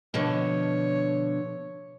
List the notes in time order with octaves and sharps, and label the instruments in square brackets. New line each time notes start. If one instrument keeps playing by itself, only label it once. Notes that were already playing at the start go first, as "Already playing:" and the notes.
[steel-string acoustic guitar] B2 D3 F3 [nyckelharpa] C#5